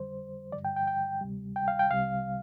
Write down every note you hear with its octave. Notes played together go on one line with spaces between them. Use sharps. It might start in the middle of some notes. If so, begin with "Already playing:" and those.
Already playing: F2 D3 G3 C5
G2 D3 G3 D5
G5
G5
G5
D2 C3 G3
G5
F5
G5
C2 C3 G3 F5